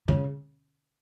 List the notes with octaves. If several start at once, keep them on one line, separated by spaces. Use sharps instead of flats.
C#3